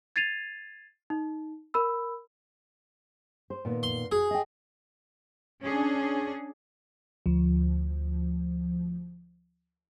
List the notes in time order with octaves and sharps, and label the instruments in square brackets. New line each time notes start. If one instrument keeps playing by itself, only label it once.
[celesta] G#6 A6 C7 D#7 F7
D#4
A#4 B5 E6
[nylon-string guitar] C5
A#2 D#3 B3
[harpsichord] C6
[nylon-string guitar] F#4 [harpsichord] G#4
[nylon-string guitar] D#5 G5
[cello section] C#4 D4 G#4
[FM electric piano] D2 F3